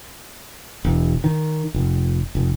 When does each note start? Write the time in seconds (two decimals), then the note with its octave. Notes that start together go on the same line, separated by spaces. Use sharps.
0.85 E1
1.24 D#3
1.74 F1
2.35 F1